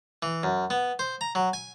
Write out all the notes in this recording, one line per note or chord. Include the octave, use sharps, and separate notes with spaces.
E3
F#2
B3
C5
A#5
F#3
G#5